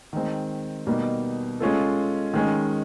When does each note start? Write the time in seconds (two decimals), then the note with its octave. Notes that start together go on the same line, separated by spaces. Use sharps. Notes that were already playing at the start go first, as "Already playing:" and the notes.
0.13 D#3 G#3 C4
0.87 B2 G3 A#3 D#4
1.60 G#3 C#4 F4 A4
2.34 D#3 G#3 C#4